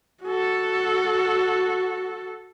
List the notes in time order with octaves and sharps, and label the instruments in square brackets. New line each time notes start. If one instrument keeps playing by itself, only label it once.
[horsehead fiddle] F#4 A4